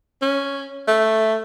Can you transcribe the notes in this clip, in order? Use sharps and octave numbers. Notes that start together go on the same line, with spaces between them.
C#4
A3